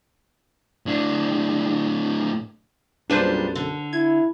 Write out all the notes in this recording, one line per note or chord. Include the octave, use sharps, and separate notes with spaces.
A2 D4
B1 F#2 A#2 G3 D4 G#4 B4 C5
D3
E4 G#6